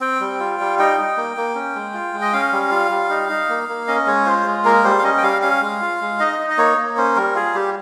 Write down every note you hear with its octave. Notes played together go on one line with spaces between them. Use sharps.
C4 G5
G3
F4
G3
D#4 G5
D#4
A#3
A#3
C#4
G#3
F4
G#3
D#5
C#4 F5
G3
F4
G3
D#4
D#4
A#3
A#3
C#4 D#5
G#3 C#5
F4 C5
G#3
A#3 A#4
G3 C5
F5
C#4 D#5
G5
G3 F5
C#4 F5
G#3
F4
G#3
D#4 D#5
D#4
D#5
A#3 C#5
A#3
C#4 C5
G3 A#4
F4 G#4
G3 G4